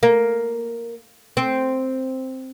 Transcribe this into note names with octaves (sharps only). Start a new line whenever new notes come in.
A#3
C4